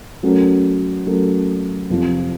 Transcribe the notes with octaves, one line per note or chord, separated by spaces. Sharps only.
F#3 A3 C#4 F#4 A#4
F#3 A3 C#4 F#4 A#4
F2 C3 F3